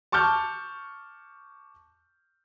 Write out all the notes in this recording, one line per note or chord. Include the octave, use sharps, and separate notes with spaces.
A5 C#6 D6 F6 G6